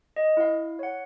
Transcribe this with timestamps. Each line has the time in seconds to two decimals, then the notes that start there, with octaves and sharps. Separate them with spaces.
0.16 D#5
0.37 E4 F5
0.79 C#5 F#5